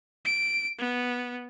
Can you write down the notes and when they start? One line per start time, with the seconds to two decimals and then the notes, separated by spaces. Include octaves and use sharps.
0.25 D7
0.78 B3